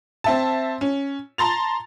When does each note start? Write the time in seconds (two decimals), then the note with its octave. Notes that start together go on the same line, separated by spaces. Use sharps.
0.24 C4 E5 A5
0.81 C#4
1.38 A5 A#5 C6 A6 F7